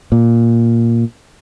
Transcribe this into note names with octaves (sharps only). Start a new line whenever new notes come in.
A#2